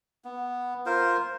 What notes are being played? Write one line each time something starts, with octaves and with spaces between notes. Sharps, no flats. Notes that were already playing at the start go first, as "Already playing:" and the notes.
B3
F4 A#4 C5